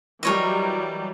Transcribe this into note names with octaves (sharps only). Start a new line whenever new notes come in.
E3 F#3 G3 A#4 C#5 D#5